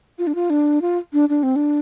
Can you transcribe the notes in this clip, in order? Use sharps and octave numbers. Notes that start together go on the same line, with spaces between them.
F4
D4
F4
D4
F4
D4
D4
C4
D4